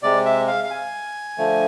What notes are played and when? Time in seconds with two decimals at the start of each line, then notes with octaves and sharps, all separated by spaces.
0.03 C3 G#3 D5
0.25 E5
0.47 F5
0.64 F5
0.70 G#5
1.38 D3 F3 A3